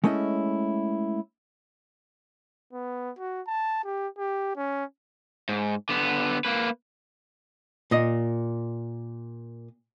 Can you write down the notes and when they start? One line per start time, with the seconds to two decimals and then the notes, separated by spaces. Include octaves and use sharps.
0.04 G#3 A3 C#4 E4 D#5
2.73 B3
3.19 F#4
3.47 A5
3.84 G4
4.18 G4
4.56 C#4
5.49 G#2
5.89 D3 B3
6.45 A#3 B4
7.91 A#2 D#5